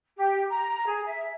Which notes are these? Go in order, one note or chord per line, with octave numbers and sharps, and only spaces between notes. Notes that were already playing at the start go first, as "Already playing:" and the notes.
G4
A#5
G#4
E5